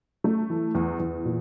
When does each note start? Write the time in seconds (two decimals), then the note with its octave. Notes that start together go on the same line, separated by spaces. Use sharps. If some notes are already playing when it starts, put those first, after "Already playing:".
0.24 A3
0.50 E3
0.75 E2
1.00 E2
1.25 A#2